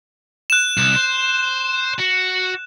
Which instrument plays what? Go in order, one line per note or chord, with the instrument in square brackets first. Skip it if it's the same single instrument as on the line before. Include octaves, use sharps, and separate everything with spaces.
[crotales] F#6 E7
[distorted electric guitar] C2
C5
F#4